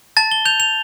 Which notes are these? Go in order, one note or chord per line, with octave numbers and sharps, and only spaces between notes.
A5 A6
G7
G6 F7
F7